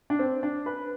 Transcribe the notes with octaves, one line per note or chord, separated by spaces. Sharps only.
D4
C4
D4
B4